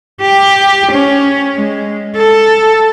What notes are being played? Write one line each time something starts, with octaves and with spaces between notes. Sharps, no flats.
G4
C#4
G#3
A4